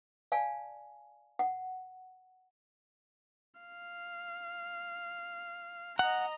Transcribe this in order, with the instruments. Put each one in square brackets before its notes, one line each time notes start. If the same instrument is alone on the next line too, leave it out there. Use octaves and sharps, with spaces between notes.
[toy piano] D5 F5 G#5 A5
F#5
[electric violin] F5
[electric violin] D#5 A#5 [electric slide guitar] F#5